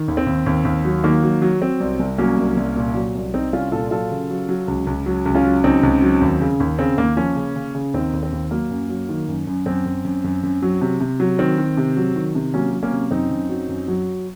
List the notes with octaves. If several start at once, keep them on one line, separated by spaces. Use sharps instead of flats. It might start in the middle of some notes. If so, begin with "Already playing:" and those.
Already playing: D#3
D#2
C4
D#2
D#2
D#2
F#3
D#3 A#3
F#3
F#3
F#3 C4
C2
C2
F#3 A#3 C#4
C2
C2
A#2
F#3
C2
C2 C4 D#4
C2 C#4 F4
A#2 F4 A4
F#3 F4 A4
C#3
F#3
F#3
C#2
C#2
F#3
C#2
C#4 F4
F#3
C#2 C4 D#4
C#2
F#3
D#2
C#3
D#2
C#3 C4
D#2 A#3
F3 A#3 C#4
C#3
C#3
C#3
D#2 C4 D#4
D#2
C4
D#2
F#3 A#3
F#2
F#3
D#3
F#2
F#2
F#2 C4
F#2
F#2
F#2
F#2
F#3
C3
C3
F#3
D#3 C4
D#3
C3
F#3
D#3
C3
F#3 A#3 C#4
F#3
A#3 C#4
C3
F#2 C4 D#4
F#2
F#3
F#2
F#3